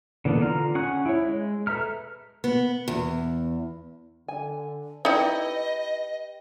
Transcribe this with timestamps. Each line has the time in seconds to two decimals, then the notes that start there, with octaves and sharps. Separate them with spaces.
0.25 D3 E3 A#3 B3 D4
0.42 D3 F4 A#5 F6
0.75 C#4 G#4 F#5 C#6 F#6
1.06 E4 C#5
1.23 G#3
1.67 A4 B4 E5 A#5 F6
2.44 B3
2.88 E2
4.28 D3 G#5
5.05 D#4 E4 G4 B4 D5 D#5